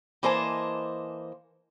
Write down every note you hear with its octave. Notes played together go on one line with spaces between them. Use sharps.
E3 A#3 C5 D#5 G#5 A5